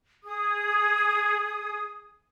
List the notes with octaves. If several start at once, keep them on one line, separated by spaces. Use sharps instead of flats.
G#4 D#6